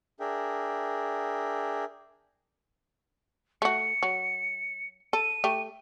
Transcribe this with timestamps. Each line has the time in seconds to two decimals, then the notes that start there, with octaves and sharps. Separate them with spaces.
0.20 D4 G#4 A#4 E5 G5
3.62 A3 F#4 C#7
4.03 F#3
5.13 A4 D#7
5.44 A3 G4